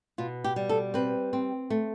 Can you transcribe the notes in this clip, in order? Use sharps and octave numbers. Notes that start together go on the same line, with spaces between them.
B2 F4
G4
G3
A4
C4 B4
C4
A3